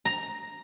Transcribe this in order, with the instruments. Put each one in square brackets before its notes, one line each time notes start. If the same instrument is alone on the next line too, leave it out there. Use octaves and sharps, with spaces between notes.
[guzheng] A#5